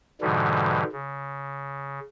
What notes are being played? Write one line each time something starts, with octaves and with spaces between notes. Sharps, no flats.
G#2 B2 D3 E3 G3
C#3